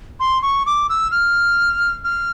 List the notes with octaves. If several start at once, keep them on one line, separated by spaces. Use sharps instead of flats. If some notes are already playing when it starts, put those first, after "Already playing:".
C6
C#6
D6
E6
F6
F6